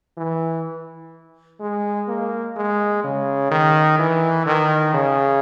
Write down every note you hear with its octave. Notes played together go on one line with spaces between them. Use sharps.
E3
G#3
A#3
G#3
C#3
D#3
E3
D#3
C#3